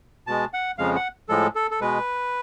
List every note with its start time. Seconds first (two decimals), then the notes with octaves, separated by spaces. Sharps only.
0.27 B2 G#3 A5
0.53 F#5
0.78 F2 C#3 F3 G#3 F5
0.96 F#5
1.29 A2 F3 G#3 A4
1.56 A4
1.71 A4
1.81 B2 G#3 B4